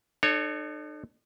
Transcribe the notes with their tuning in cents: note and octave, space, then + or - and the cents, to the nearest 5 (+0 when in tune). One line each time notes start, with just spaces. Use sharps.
D#4 -45 A4 +0 C#5 +0